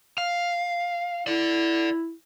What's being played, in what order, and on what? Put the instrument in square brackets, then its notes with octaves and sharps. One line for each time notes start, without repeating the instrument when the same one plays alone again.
[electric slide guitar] F5
[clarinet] E4 [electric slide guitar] A4 D5